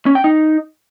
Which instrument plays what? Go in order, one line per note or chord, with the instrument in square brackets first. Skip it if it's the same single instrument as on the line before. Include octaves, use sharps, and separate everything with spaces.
[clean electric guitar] C#4
G5
D#4